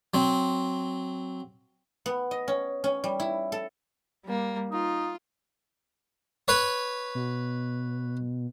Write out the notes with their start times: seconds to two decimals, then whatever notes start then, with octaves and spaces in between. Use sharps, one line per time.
0.14 F#3 C4
2.06 B3
2.31 D#5
2.48 C#4
2.84 C#4
3.04 G3
3.20 E4
3.52 A4
4.23 G3 A#3
4.71 D#4 F4
6.48 B4 C#5
7.15 B2